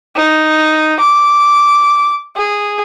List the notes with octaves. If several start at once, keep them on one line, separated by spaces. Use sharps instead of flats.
D#4
D6
G#4